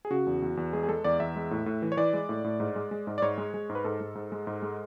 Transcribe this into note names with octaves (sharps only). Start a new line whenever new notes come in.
G#4
C#3 F#4
E2
E2
E2
G#3 G#4
G#4
G#3 A4
E2 D5
E2 E5
G#3
A2
A2
E3
C#5
E3 D5
G#3
A2
A2
G#2
G#3
G#3
G#2
D5
G#2 C#5
G#3
G#3
G#2
B4
G#2 A4
G#2
G#2
G#3
G#2
G#3